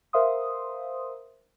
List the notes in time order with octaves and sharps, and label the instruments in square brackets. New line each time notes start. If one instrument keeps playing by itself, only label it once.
[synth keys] A#4 C5 E5 F5 C6 D#6